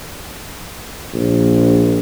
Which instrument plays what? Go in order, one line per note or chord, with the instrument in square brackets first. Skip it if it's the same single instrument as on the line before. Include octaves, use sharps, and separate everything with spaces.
[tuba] A#1